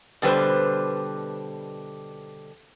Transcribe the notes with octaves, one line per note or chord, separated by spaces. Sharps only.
B2 D3 G3 B4 C5